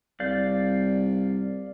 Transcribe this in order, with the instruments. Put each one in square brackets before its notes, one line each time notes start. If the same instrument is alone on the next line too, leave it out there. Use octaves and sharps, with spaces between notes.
[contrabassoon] C2 [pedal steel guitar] D5 F5 G6